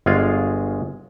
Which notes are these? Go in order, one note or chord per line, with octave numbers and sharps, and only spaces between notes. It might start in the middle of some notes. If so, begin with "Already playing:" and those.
G1 G#3 F4 G#4 F5